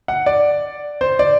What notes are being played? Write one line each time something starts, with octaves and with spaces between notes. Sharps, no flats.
F#5
D5
C5
D5